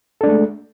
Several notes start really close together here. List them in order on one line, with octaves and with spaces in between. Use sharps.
A4 D4 G#3 A3